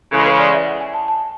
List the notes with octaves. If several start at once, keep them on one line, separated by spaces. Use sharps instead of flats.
C#3 E3 G#3 A4
B4
D5
E5
F#5
G#5
A5
A5